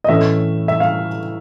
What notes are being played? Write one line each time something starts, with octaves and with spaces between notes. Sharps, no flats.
D#5
A2 E3 A3 C#4 E5
E5
F5